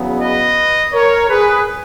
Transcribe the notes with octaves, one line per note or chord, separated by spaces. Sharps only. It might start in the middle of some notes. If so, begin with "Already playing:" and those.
Already playing: E2 C#3 F#3 B3
B4 D#5
A#4 C#5
G#4 B4